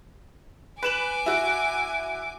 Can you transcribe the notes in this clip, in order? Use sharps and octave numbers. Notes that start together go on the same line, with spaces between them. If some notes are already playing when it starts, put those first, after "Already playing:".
B4 G#5 D6 E7 F#7
E4 F#4